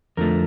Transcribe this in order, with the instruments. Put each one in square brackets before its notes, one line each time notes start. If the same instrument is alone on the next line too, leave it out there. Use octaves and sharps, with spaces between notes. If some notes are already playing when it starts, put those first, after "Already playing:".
[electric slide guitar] F2 D3 F3 A3 A#4